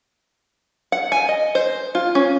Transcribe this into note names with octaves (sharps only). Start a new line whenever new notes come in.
F#5
G#5
D#5
C5
F4
C#4